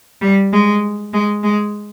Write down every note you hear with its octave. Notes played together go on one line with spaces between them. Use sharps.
G3
G#3
G#3
G#3